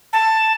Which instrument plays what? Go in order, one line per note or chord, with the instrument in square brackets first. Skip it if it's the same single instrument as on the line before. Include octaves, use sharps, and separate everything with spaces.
[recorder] A5